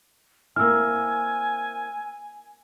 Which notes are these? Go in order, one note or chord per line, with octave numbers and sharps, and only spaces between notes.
A#3 C4 E4 G#5 E6 F6